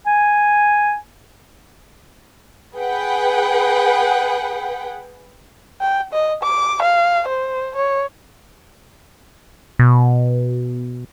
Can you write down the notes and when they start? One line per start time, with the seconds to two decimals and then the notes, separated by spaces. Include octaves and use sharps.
0.06 G#5
2.76 G#4 B4 F#5 G5
5.81 G5
6.13 D#5
6.43 D6
6.82 F5
7.28 C5
7.76 C#5
9.79 B2